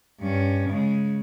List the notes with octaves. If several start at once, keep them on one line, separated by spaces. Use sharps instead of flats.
G2 C#4
C#3 G#3